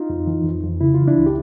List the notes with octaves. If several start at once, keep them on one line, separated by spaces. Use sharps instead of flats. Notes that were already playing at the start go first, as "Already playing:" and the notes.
Already playing: D#4 F4
F2
E3
F2
F2
C#3 E4
E3 F4
D4 E4
C#2
G4